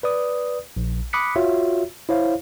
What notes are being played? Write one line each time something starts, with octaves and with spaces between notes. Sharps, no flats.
B4 D5 D#6
A#1
B5 D6 D#6 F#6 B6 C#7
F4 F#4 C#5 E5
E4 C5 C#5 F5